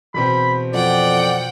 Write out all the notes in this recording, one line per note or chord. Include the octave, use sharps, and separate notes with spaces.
E2 B2 C4 B5
F2 D5 F#5 G5